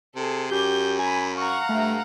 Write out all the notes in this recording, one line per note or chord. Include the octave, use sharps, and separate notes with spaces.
C3 G#4 A4
F#2 G4 G6
G#5 A#5 B5
F5 F#5 A#5 C#6
G2 A3